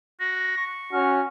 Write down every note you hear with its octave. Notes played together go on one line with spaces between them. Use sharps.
F#4 A#6
C#6
C#4 F#4 F6